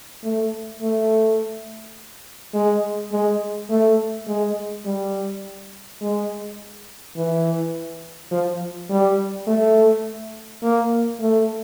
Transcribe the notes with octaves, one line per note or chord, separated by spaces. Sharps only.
A3
A3
G#3
G#3
A3
G#3
G3
G#3
E3
F3
G3
A3
A#3
A3